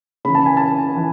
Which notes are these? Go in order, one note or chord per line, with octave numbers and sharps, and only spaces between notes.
C#3 E3 B5
A5
G#5
A5
E3